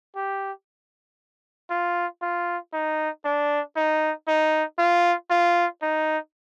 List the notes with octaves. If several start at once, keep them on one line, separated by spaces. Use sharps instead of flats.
G4
F4
F4
D#4
D4
D#4
D#4
F4
F4
D#4